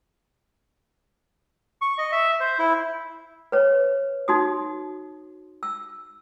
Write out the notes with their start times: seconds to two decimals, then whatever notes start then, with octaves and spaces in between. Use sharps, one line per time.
1.81 C#6
1.98 D#5
2.12 E5
2.40 C5
2.59 E4
3.52 B4 C#5
4.28 D#4 F#4 D#6
5.63 E6